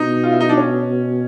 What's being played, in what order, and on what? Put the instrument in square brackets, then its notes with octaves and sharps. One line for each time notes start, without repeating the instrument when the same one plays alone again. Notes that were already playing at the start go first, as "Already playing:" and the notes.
Already playing: [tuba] B2 [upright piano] D#4
[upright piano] F4
E4
D#4
D4
C#4